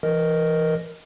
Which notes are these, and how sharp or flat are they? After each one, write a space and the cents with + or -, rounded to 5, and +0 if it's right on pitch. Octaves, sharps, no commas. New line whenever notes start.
E3 +25 A#4 +0 D#5 -5